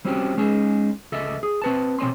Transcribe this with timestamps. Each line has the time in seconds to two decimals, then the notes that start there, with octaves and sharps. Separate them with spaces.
0.05 G3 C4 C#4 F#4 G4
0.37 G#3 C#4 D#4 G#4
1.12 C#2 A4 D#5 E5
1.43 G#4
1.62 C4 B4 A5
1.99 B2 C4 C#5 G#5 C6